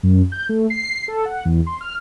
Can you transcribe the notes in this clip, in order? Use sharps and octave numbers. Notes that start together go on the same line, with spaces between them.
F#2
G6
A3
C7
A4
F#5
E2
C6
F6